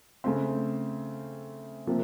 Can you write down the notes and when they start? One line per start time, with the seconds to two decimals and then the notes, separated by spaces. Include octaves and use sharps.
0.24 C#3 A3 C4
1.87 C3 F3 A#3